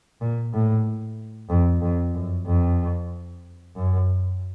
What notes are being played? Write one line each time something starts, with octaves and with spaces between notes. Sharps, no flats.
A#2
A2
F2
F2
F#2
F2
F#2